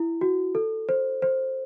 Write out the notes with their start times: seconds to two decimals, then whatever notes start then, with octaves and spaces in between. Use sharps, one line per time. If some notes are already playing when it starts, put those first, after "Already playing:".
Already playing: E4
0.21 F#4
0.55 A4
0.89 C5
1.22 C5